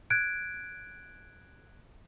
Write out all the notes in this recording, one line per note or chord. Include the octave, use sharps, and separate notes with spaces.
F#6 G#6 D7